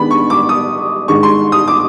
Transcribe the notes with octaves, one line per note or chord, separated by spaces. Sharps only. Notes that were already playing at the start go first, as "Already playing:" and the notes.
Already playing: D#3 G#3 B3 D4 B5
C#6
D6
D#6
G#2 D#3 G#3 C#6
C6
D#6
D6